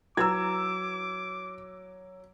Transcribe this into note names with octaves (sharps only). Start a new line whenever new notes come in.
F#3 E4 B4 A#5 D6 E6 G#6